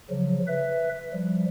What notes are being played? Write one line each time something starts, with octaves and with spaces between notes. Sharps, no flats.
C#3 F3 F#3
B4 E5
F3 G3